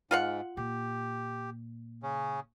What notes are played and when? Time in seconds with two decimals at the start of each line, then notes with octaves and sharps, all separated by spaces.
0.11 G#2 F4 F5 F#5
0.57 A#2 G4
2.03 C#3 C#4